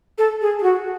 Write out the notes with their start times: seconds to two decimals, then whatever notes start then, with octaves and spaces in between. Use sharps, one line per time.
0.18 A4
0.41 G#4
0.59 G#4
0.63 F#4